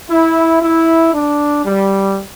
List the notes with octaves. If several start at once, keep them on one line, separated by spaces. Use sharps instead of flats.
E4
E4
D4
G3